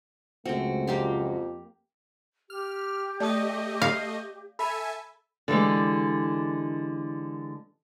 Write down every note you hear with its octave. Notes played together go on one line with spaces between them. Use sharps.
C#2 F#2 A3 C4 F#4
F2 A#3 G4 C6
G4 F6
A3 D5 D#5 A5 D#6
F5
A4 E5 G#5 B5
D3 E3 G3 G#3